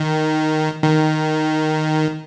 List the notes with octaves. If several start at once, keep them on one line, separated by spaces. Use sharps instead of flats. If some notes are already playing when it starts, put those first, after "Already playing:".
Already playing: D#3
D#3